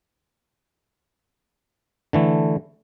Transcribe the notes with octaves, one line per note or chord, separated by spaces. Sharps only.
D3 E3 A3